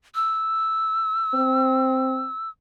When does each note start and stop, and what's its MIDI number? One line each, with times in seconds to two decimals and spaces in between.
0.15 2.49 88
1.34 2.27 60